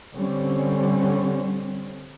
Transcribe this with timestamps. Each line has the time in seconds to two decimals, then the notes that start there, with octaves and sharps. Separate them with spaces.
0.15 D3 G3 C4 C#4